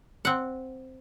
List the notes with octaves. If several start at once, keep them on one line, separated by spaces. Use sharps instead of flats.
C4 F#5